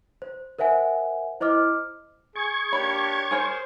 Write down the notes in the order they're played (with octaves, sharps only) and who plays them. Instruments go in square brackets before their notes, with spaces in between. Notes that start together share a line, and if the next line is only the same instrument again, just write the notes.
[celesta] C5
A#4 C5 E5 F#5 G#5
E4 C5 D#5 D6 F6
[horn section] G#4 [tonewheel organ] C#6 G#6
[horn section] A#3 D4 G4 [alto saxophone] C#5 [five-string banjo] B5
[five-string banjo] G#4 A#4 C#5 [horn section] C5